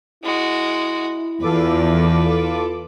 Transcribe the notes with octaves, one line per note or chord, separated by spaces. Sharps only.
G#3 E4 F#4
E2 F4 A4 B4 D6